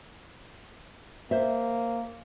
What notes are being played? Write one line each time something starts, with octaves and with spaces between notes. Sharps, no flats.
A#3 C5 E5